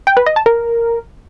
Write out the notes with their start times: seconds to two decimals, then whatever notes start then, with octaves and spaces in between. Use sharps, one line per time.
0.07 G5
0.17 B4
0.26 D#5
0.36 A5
0.46 A#4